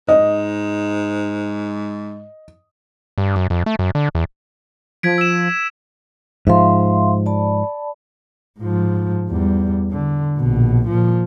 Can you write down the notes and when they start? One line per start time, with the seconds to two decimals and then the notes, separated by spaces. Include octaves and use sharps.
0.09 G#2 D#5
3.18 G2
3.36 F#2
3.50 F2
3.66 A3
3.79 F#2
3.95 D3
4.15 E2
5.03 F3 G#6 B6 D7
5.18 E6 E7
6.47 G#2 F3 E5 F5 C6
7.26 D5 A5 B5
8.60 G#2 F3
9.29 E2 G3
9.91 D3
10.38 A#1 B2
10.87 A#2 F3